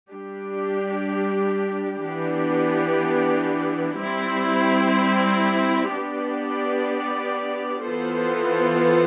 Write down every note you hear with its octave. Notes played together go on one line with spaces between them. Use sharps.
G3 D4 G4
E3 B3 D4 G4
G3 C4 E4
B3 D4 G4 D5
E3 B3 F4 A4 C5